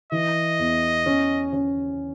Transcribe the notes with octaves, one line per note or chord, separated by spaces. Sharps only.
E3 D#5
E2
C#4
C#4